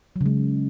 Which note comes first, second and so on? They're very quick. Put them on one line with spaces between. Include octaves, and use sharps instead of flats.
F#3 C#3 G#3